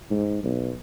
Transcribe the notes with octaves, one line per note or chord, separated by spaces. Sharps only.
G#2
B1